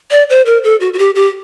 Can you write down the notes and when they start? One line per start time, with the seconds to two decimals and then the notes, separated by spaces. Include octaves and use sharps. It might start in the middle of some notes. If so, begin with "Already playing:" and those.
0.11 D5
0.30 C5
0.46 A#4
0.64 A4
0.80 F#4
0.93 F#4
0.99 G4
1.15 G4